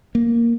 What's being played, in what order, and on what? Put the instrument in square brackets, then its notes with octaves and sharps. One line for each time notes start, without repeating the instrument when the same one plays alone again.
[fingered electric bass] A#3